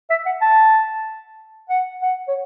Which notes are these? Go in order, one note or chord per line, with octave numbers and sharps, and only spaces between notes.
E5
F#5
A5
F#5
F#5
C#5